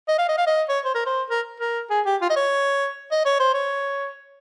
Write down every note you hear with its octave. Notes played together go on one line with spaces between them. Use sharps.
D#5
F5
D#5
F5
D#5
C#5
C5
A#4
C5
A#4
A#4
G#4
G4
F4
D#5
C#5
D#5
C#5
C5
C#5